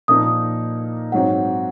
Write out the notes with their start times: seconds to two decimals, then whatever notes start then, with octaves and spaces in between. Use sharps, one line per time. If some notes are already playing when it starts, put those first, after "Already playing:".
0.08 A#2 F3 A#3 D#4 D#6
1.12 G#2 F#3 C4 F#5